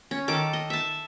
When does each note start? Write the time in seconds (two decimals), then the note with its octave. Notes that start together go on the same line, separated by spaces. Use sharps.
0.11 C#4
0.28 D#3 A4 D6
0.53 D#5
0.70 E5 A5